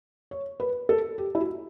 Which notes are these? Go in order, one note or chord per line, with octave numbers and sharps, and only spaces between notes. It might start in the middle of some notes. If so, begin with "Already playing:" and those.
C#5
B4
A4
G4
E4
F#4